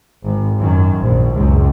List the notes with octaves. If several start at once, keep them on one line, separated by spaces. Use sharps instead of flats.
G#1
F#2 D#3
A#1
C#2 F#2